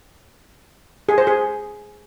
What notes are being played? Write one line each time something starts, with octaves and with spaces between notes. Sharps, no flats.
G#4
C5
G#4